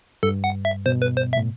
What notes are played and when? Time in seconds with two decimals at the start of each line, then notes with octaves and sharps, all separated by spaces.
0.23 G2 A4
0.44 F#5
0.65 E5
0.86 B2 C5
1.02 B4
1.17 C5
1.33 E5
1.37 A2